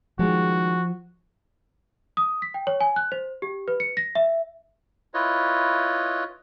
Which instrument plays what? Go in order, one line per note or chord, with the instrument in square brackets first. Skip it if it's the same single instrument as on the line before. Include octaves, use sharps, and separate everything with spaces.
[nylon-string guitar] D#3 G3 G#3 [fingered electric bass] F3 [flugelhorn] F#4
[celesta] D#6
B6
G5
C#5
G#5
F#6
C5
G4
B4
C#7
A#6
E5
[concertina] E4 F4 B4 C#5 D#5